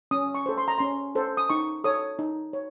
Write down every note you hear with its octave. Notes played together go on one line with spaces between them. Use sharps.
C#4 D#6
C#6
A4 C5
C6
A#5
C#4 C6
A4 C5
D#6
D#4 C#6
A4 C#5 D#6
D#4
C#5